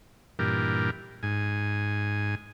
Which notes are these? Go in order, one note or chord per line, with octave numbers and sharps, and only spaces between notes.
G2 A#2 E3 G4 A#4
G#2 G#5